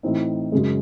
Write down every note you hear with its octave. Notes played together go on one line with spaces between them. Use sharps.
A2 E3 C4 D#4
F#2 C#3 G#3